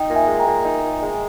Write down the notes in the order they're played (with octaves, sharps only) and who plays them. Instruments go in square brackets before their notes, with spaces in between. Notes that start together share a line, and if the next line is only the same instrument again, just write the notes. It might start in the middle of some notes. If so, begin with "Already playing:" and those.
Already playing: [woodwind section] D#4 [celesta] D#5 G5
[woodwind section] A#2
[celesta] E5 G#5
[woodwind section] G#3
[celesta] G5 A#5
[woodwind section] A#2
D#4
A#2
G#3